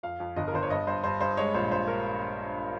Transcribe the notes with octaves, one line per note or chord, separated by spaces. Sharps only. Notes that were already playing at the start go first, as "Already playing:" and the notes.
F2 F5
F2
G1 D#5
A#4
G1 C5
C#5
G2 D#5
G2 C5
G2 C5
G2 C5
G#3 C#5
A#1 C5
A#1 C5
A#4